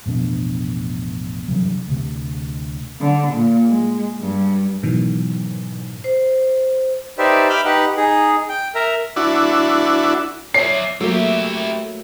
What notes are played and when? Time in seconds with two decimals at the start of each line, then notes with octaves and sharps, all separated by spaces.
0.06 A1 F2 B2 D4
1.48 G2 C3 E3 F#3
1.87 D2 C3
3.01 D3
3.34 A#2
3.67 G#3
4.22 G2
4.83 G#2 B2 D#3 E3 F#3
6.04 C5
7.18 D#4 G4 B4 C5 D5 E5
7.49 E5 B5 D6 F6 G6
7.65 D#4 G4 B4 F#5
7.97 D#4 G#4
8.49 G5
8.75 A#4 E5 A#5
9.16 D4 E4 F#4
10.54 E4 C#5 D5 C7
11.01 F#3 A3 A#3 E4 G4